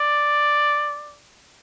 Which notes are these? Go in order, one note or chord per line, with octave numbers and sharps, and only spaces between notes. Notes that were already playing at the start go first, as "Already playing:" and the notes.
Already playing: D5